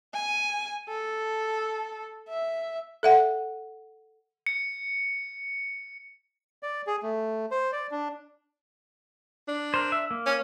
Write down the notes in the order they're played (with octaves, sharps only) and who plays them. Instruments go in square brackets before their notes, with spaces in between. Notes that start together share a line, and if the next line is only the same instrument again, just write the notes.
[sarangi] G#5
A4
E5
[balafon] A4 E5 F#5
[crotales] C#7
[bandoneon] D5
G#4
A3
C5
D5
D4
[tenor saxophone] D4
[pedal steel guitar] A#4 C5
E5
A#3
[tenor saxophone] C#4